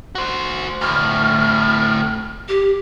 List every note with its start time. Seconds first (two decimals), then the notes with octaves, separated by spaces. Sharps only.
0.15 F#4 C5
0.81 D2 A2 F6
2.49 G4